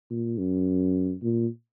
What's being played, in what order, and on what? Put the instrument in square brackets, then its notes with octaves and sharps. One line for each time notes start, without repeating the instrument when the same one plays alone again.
[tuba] A#2
F#2
A#2